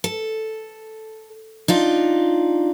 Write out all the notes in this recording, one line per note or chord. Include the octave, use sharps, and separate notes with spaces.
A4
D4 D#4 F4